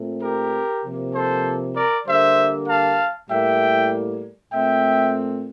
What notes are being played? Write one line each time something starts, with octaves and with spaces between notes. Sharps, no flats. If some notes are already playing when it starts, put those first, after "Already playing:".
Already playing: A#2 A3 C4
G4 A#4
C3 F3 A#3
A4 C5
A#4 D5
D3 G3 A#3 C5 E5
F5 A5
A2 G3 A#3 E5 G5
A#2 A3 C4 E5 G5